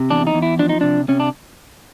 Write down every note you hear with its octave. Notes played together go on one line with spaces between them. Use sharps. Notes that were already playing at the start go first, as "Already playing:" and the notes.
Already playing: C3
E2 D4
D#4
E2
E4
F3 D4
D#4
C3 D4
C3 C#4
D4